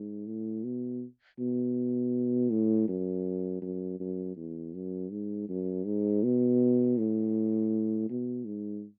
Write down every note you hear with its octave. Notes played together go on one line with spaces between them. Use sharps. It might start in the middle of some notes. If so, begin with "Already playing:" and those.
Already playing: G#2
A2
B2
B2
A2
F#2
F#2
F#2
E2
F#2
G#2
F#2
G#2
B2
A2
B2
G#2